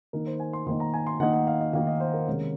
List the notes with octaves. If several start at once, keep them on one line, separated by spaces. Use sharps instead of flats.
D#3 A#3 D#4 A#4
C5
G#5
C6
D#3 A#3 D#4 C6
A#5
G#5
C6
D#3 A#3 D#4 F#5
F#5
F5
D#5
D#3 A#3 D#4 F5
D#5
C5
A#4
C3 D#3 G#3 C#4